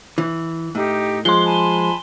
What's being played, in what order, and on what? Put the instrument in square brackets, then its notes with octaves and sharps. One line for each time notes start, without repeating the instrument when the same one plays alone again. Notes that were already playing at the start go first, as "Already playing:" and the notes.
[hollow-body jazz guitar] E3
[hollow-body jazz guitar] A2 [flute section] D#4 G4
[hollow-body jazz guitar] F3 G#3 [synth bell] C6 G7
[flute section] G#5 A5 B5